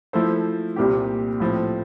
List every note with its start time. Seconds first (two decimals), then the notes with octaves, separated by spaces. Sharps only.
0.13 F3 A3 E4 A4 C5
0.76 C2 A#2 G3 C4 G4
1.40 A2 F3 C4